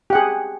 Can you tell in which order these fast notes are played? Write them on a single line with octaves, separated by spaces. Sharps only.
G4 F#5 G#4